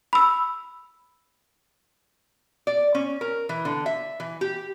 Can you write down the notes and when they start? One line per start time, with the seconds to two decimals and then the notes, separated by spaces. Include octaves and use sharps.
0.13 B5 E6
2.67 D5
2.95 C#4
3.21 A#4
3.49 E3
3.65 D3
3.86 E5
4.20 E3
4.41 G4